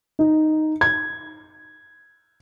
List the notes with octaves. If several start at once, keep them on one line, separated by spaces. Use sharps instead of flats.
D#4
G#6